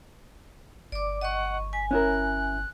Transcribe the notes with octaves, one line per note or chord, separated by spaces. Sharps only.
G1 D5 D6
D#5 F#5 C#6
G#5 B6
C#4 E4 A#4 F#6